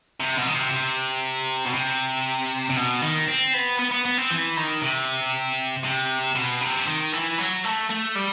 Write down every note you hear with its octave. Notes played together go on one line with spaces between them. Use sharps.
C3
B2
D#3
C3
C3
B2
C3
C3
B2
D#3
C4
B3
B3
B3
B3
C4
E3
D#3
C3
C3
B2
C3
D#3
E3
F#3
A3
A3
G3